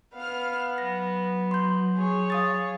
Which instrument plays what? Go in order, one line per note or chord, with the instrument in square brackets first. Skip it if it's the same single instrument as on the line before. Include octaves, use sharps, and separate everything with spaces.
[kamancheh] B3 [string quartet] F5 F6
[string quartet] F#3 [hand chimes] A#6
[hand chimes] C6 G6
[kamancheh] G#4 C#5
[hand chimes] F5 D#6 A6